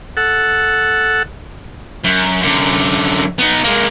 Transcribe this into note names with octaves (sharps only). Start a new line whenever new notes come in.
A4 F#5
F#2
F#2 D3
B3 D#4
G#3 A#3